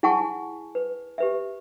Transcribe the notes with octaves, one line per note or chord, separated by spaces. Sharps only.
E4 G#4 F#5 G#5 A5 C#6
B4
G4 B4 E5